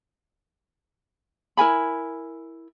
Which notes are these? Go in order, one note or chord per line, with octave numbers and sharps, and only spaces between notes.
E4 A#4 G#5 B5